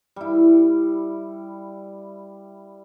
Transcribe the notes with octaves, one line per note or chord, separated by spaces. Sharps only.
G3 E4